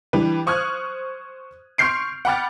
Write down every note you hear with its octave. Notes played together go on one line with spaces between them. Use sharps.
E3 G3 D4 B4
C5 C#6 D#6 F6 F#6 G#6
C6 C#6 F6 G6 C7 D7
F#5 G5 B5 D6 F6 A6